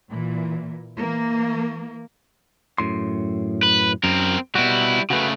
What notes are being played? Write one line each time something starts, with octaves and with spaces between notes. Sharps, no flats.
A#2 E3
E3 A#3
F#2 A2 C6
B4
F#2 C4 A#4
B2 G3 E4 F#4
C#3 A3 F#4 B4